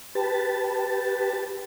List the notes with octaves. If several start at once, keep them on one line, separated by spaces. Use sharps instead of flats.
G4 B4 A5